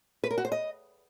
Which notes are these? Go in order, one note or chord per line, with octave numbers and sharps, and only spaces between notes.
B4
A#4
F#4
C5
D#5